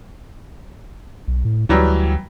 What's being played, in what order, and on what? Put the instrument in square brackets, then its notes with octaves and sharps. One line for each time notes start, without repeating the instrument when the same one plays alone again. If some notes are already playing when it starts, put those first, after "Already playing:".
[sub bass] B1
A2
[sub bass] D2 [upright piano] E3 F#3 G3